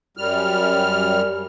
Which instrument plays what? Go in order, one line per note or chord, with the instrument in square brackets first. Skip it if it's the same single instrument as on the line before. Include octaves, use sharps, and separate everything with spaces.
[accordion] F#2 G3 F6